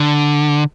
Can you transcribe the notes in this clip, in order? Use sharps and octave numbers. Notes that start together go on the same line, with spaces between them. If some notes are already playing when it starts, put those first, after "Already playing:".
Already playing: D3